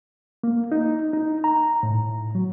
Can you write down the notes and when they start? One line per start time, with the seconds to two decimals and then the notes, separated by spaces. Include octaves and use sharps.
0.43 A#3
0.72 D#4
1.13 D#4
1.44 A#5
1.83 A2
2.35 F#3